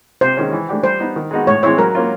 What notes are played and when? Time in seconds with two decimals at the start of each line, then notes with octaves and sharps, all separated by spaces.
0.21 C3 C5
0.37 D#3 G#3 C#4
0.52 E3
0.69 A3 D4 G4
0.83 G3 C5
1.00 B3 D#4
1.16 D#3
1.31 G#3 B3 D#4 F#4
1.47 A2 C#5
1.63 E3 G#3 C4 E4 C#5
1.78 F#3 A#4
1.95 A#3 C#4 F4